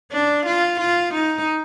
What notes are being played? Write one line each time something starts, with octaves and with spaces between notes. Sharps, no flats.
D4
F4
F4
D#4